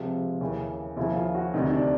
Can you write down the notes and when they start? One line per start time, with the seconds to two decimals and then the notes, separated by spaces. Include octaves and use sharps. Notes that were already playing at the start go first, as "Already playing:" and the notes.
Already playing: C#2 C3 F3
0.41 D#2 C#3 E3
0.97 D#2 C#3 F3 E4
1.16 F4
1.35 F#4
1.54 D2 C3 D#3 D#4
1.72 D4